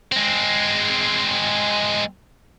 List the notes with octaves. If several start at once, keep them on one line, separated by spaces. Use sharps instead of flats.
G#3 C4